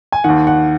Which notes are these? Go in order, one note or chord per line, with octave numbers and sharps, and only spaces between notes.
G#5
D#2 D#3 F#5
F#5